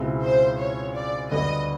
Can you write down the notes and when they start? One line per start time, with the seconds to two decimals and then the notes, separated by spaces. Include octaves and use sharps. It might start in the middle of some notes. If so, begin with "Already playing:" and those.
Already playing: C#2 B2 G#3 C4 E4
0.22 C5
0.58 C#5
0.94 D5
1.31 D2 D3 G3 B3 D#5